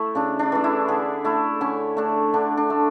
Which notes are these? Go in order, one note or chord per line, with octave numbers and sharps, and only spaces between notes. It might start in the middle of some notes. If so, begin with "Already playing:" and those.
Already playing: A3 E4
C#3 D4
D4
E3 A3
E4
D3 G#4
A3 E4
D3 C#4
A3 D4
D3 D4
D4
A3